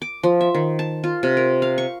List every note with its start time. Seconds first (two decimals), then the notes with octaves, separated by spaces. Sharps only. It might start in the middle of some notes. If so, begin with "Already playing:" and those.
0.02 D6
0.23 F3
0.41 E5
0.54 D#3
0.79 A5
1.04 F4
1.23 C3
1.37 A#4
1.62 F5
1.78 C#6